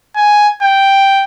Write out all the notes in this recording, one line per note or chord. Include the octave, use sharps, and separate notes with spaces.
G#5
G5